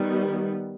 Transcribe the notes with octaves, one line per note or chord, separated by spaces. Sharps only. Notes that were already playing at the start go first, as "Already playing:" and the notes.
Already playing: D#3 G3 B3